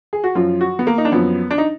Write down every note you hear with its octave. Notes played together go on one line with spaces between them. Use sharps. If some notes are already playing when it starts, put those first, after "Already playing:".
G#4
F#4
F#2 F3 F4
F#4
B3
A#3
D#4
D4
F#2 F3 B3
D4
D#4